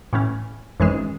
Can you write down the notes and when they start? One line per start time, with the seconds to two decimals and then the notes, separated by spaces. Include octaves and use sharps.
0.13 A2 E3 A3 C#4
0.80 G#1 F#2 E3 G#3